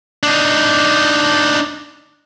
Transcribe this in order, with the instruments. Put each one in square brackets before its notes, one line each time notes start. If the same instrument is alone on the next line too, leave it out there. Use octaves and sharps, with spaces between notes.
[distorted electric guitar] D4 D#4